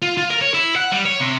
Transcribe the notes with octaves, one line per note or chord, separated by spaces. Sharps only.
F4
F4
A#4
C#5
E4
F#5
G3
C#5
C3